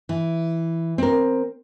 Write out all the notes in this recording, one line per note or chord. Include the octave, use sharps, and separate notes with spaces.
E3
C4 A#4